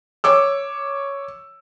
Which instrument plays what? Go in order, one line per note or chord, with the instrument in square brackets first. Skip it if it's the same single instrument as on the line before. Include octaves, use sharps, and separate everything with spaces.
[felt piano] C#5 D6 E6